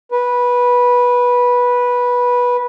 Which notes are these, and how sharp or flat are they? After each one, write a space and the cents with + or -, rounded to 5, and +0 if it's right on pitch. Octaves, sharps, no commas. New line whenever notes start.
B4 -15